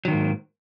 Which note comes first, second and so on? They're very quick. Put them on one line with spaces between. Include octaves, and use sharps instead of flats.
F#3 D#3 A#3 G#2